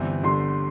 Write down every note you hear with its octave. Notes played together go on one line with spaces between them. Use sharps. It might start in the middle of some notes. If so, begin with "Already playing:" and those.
Already playing: G1 G2 E3 C4
G1 G2 D3 C6